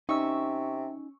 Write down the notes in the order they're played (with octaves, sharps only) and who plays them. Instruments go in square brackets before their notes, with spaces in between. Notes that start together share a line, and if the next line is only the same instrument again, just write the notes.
[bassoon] C3 [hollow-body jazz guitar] C#4 [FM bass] D#4 [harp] C#6 E6